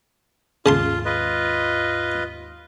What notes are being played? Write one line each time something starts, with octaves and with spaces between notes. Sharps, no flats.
D#2 G#2 C#3 F4 A5 C6
F4 B4 D#5